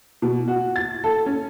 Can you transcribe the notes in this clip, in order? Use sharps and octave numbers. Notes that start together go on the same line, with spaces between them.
B2
F#4
A6
A4
C#4